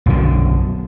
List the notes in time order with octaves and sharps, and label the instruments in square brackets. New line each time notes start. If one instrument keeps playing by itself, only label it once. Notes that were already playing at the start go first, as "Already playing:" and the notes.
[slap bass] B1 F#2 B2 D3